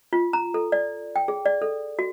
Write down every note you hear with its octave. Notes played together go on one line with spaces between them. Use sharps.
F4
A#5
A4
D5
G5
G#4
D5
A4
F#4